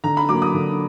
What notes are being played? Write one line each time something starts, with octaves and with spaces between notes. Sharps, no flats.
D3 A#5
B5
F#3 A#3 D6
D#6
D3